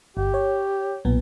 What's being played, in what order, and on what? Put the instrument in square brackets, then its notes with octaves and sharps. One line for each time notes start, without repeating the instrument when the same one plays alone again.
[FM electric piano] G1 [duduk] G4
[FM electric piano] C#5
B1 A#2 B3